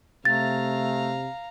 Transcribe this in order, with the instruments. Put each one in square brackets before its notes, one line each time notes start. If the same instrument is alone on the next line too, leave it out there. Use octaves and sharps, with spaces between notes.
[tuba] C3 [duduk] A3 [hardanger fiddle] F5 A#5 [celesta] A6